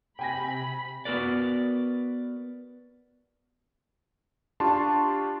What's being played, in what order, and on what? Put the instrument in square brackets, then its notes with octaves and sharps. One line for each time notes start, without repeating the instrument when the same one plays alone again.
[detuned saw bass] C3 [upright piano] G5 G#5 A#6 [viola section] B5
[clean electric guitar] B3 F#4 A#4 B4 D5
[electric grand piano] D4 F4 G4 A5 C6 C#6